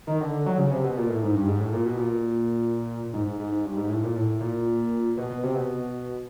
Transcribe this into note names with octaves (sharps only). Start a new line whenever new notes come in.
D#3
D3
D3
F#3
C#3
C3
B2
A#2
A2
G#2
G2
G#2
A2
A#2
B2
A#2
G#2
G#2
G#2
G#2
G2
G#2
A2
A#2
A2
A#2
B2
B2
C3
B2